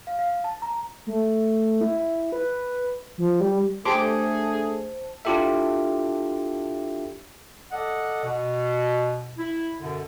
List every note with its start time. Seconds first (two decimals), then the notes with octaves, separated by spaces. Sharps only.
0.07 F5
0.19 F5
0.44 A5
0.62 A#5
1.07 A3
1.81 E4
1.97 E4
2.32 B4
3.18 F3
3.40 G3
3.85 A3 D4 G4 G#4 C5 A5 C6 D6
5.25 D4 E4 F4 G4 A4 E5
7.72 A4 D5 D#5 F#5
8.24 B2
9.38 E4
9.80 F#2 B2 D3